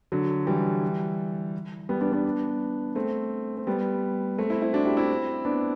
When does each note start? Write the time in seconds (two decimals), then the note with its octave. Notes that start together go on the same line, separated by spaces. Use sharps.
0.12 D3 F#3
0.47 E3 G3
1.89 G3 B3
2.01 B3 D4
2.12 B3 D4
2.95 A3 C4
3.57 C4
3.67 G3 B3
4.38 A3 C4
4.50 C4 E4
4.62 C4 E4
4.73 D4 F#4
4.85 E4 G4
4.97 C4 E4
5.45 B3 D4